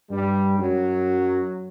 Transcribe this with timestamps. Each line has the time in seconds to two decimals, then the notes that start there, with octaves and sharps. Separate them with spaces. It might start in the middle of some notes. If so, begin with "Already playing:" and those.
0.11 G2 G3
0.58 F#2 F#3